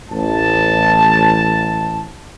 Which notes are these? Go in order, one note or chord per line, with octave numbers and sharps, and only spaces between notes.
A1 A5